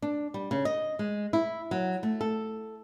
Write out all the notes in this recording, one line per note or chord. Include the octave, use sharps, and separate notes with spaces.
D4
G3
C#3
D#5
G#3
E4
F#3
A3
A4